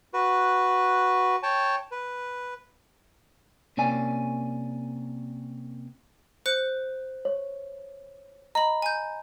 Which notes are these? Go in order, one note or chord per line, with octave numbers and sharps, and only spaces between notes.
F#4 B4
C#5 G5 A5
B4
C3 A#3 C#4 D5 G#5
C5 F#6 C#7
C#5
D#5 A#5 B5
G#5 G6